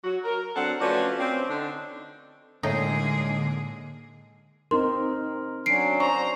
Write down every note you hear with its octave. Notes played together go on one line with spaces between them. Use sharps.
F#3 F#4
A#4
F#3 C4 D4 A4 F#5
F3 A3 C#4 F#4 B4 D5
C4 C#4
D3 D4 D#4
A2 D3 G#3 A#3 D#4 G#4
C4 D#4 A#4 C6
F#3 C#4 D4 C7 D7
C5 A#5 C#6